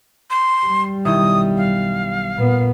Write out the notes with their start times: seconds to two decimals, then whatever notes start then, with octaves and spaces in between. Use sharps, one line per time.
0.30 C6
0.67 G3
1.05 B1 D#3 E4 D#6
1.57 F5
2.37 A#2 B3